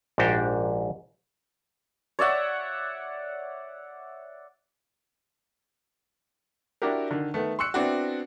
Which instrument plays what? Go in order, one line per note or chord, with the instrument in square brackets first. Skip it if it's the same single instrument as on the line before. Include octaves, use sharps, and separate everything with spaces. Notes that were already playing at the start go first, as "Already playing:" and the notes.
[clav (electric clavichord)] A#1 G#2 D4 F#4 G4 G5
[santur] C#5 D5 E5 F#5
[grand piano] D4 E4 F#4 G4 A#4
D3 D#3
D#3 A3 B3
C6 C#6 E6 F#6 C#7
B3 C4 D4 E4 F#4